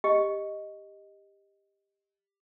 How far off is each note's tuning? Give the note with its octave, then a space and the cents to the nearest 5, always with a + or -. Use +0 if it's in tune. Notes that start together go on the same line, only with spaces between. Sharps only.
G4 +15 D#5 +0